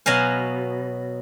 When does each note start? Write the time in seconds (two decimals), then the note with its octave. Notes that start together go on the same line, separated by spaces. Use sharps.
0.06 B2 F#3 D#5 F5 G#5